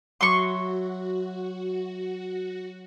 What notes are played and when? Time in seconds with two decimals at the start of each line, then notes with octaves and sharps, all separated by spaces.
0.21 F#3 F#4 E5 C6 C#6